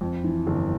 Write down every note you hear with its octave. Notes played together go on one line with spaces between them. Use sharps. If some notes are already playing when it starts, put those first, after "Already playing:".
F2
E3
G1